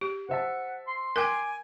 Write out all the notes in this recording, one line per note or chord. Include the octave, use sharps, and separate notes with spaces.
G4
C5 E5 F#5 A5
C6
A#4 G5 G#5 D6 G6